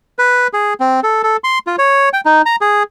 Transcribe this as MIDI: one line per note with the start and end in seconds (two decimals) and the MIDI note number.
0.19 0.47 71
0.53 0.74 68
0.80 1.00 60
1.03 1.22 69
1.23 1.37 69
1.44 1.59 84
1.67 1.76 65
1.78 2.09 73
2.13 2.21 79
2.25 2.42 63
2.46 2.56 82
2.61 2.83 68